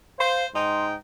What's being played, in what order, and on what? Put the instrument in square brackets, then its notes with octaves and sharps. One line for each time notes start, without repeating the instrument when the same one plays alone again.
[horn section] C5 [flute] F5
[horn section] G#2 D#4 G5 [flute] C6